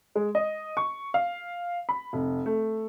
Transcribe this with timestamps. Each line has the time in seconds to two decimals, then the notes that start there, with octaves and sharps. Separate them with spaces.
0.15 G#3
0.35 D#5
0.77 C#6
1.14 F5
1.89 B5
2.13 F1
2.46 A3